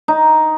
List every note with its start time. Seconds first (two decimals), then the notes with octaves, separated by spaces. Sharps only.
0.08 D#4